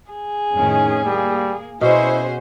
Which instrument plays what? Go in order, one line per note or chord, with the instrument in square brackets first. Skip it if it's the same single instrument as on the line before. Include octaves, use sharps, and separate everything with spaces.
[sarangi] G#4
[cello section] F2 A2 D#3 [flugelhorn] C#4
[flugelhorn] G3 [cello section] A#3
[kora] B2 [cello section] C#4 F#4 C5 [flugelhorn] E4 [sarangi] G#4